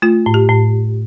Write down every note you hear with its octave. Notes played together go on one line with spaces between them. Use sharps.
A3 F4
A2
G4
A2